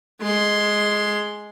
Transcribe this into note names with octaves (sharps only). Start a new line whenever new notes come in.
G#3 C6